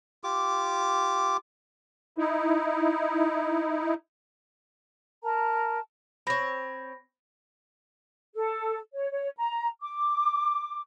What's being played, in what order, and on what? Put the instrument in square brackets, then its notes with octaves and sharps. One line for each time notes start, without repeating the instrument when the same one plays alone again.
[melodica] F4 G4 D6
[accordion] D#4 E4
[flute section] A#4 A5 A#5
[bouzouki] C4 C#5 [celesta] B5 A#6
[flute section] A4
C#5
C#5
A#5
D6